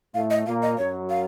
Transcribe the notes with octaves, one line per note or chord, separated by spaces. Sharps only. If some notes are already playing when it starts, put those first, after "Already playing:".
A2 A3 F5
D#5
A#2 A#3 F5
D#5
F#2 F#3 C#5
F5